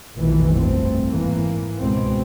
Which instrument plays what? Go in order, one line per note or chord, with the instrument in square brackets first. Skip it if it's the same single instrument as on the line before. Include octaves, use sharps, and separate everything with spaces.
[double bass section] F1 A#1 B2 D#3 E3
G1 A3 C4
G#2 E3 A#3
C#2 B2 G#3 C4